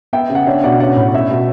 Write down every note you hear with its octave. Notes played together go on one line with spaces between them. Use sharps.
B3 E5 G5
C#3
F#5
D4 C#5 E5
B2 D5 F#5
C#4 D5 F#5
A2
C#4 C#5 E5
B2